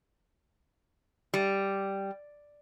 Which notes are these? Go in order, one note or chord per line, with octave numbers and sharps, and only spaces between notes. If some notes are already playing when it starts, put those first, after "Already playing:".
G3